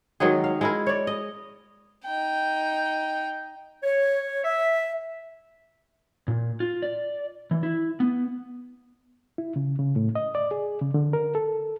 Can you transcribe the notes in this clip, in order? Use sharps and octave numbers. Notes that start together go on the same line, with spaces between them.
D#3 F#3 G#3 G#4
F5
G#3 E4 A#4
C#5 D5
D#5
D#4 G5
C#5
E5
A#2
F4
D5
E3
E4
B3
E4
C#3
C#3
A2
D#5
D5
G#4
C#3
D3
A#4
A4